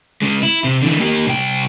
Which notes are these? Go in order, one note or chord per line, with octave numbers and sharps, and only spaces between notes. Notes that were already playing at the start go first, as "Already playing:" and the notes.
C#3 G#3
E4
C3
D3 E3
A#3 G4
C2 G5